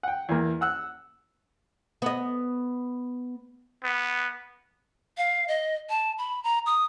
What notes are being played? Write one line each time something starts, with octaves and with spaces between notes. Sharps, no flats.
F#5 G5
E2 A#3
F#5 E6 F#6
B3 D#5
B3
F5
D#5
A5
B5
A#5
D#6